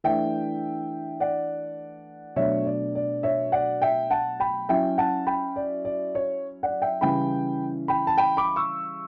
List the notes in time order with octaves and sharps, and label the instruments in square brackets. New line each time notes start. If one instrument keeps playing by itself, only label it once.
[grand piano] E3 A3 D4 E5 G5
D5 F#5
B2 F#3 A3 D4 C#5 E5
D5
D5
C#5 E5
D5 F#5
E5 G5
F#5 A5
G5 B5
F#3 C#4 E4 E5 G5
F#5 A5
G5 B5
D5
D5
C#5
D5 F#5
E5 G5
C#3 E3 G3 C#4 E4 G5 B5
G5 B5
A5
G5 B5
B5 D6
C#6 E6